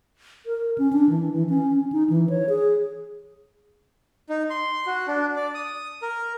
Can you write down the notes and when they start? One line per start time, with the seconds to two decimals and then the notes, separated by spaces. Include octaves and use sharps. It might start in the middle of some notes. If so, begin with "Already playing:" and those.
0.46 A#4
0.78 C#4
0.93 D4
1.10 E3
1.33 E3
1.49 C#4
1.71 C#4
1.92 D#4
2.10 E3
2.30 C#5
2.49 G#4
4.29 D#4
4.50 C6
4.86 F#4
5.08 D4
5.36 D5
5.54 D#6
6.02 A#4